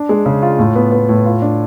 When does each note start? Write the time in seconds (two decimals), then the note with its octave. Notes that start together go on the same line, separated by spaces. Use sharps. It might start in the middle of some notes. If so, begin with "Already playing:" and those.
Already playing: D4
0.09 G#3
0.26 C#3
0.42 F4
0.59 A2
0.76 B3
0.92 B3
1.09 A2
1.26 F4
1.42 D4